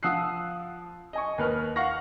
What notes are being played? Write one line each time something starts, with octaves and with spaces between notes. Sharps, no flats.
F3 F#5 D#6 E6 F#6 C7
D#5 G#5 C#6
D#2 B4 F6
F5 F#5 C#6 F6 A#6